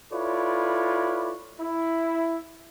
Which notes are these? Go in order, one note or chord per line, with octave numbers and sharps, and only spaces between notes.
E4 F4 A4 B4 C#5 D5
E4